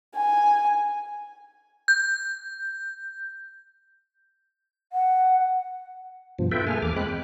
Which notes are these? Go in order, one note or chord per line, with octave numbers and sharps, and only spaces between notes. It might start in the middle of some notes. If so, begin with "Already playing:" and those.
G#5
G6
F#5
G2 B2 F3
F4 A4 B4 E5 G5
A3 A#3 G#4 A4 G#5 F6
E2 D6 F6
G#3 C4 B5 F#6
G5